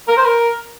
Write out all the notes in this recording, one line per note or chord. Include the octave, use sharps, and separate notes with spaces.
A#4
C5
A#4